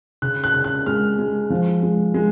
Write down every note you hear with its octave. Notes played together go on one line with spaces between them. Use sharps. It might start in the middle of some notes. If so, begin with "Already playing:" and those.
C#3 F#6
F#6
C#3
F#6
G#3 F6
G#3
F3
G#3
G#3